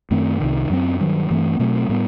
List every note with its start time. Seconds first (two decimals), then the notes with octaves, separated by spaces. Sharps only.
0.11 F#2 D#3 A3 C4
0.40 C2 C3 D#3
0.70 F#2 F#3 A3 C4
1.00 G2 D#3 F#3
1.30 G2 E3 A3 C4
1.59 B2 F#3 A3 C4
1.89 A2 G3 B3